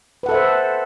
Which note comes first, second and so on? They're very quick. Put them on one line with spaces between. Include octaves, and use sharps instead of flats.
B4 F#5 A4 E5 C5